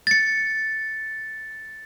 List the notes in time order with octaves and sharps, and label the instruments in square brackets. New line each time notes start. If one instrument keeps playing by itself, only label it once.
[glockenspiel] A6 C#7